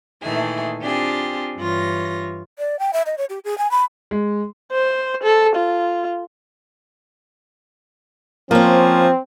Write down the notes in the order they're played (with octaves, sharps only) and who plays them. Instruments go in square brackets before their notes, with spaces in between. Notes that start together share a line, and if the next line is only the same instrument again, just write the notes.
[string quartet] A#2 D#3 E3 A3 G#4
C4 D4 F4 G4 G#4
G2 E3 F4 C#5 A#6
[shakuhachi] D5
G5
E5
D#5
C#5
G4
G#4
G#5
B5
[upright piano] G#3
[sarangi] C5
A4
F4
[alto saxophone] F3 [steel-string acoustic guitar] A#3 C#4 [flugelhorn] C4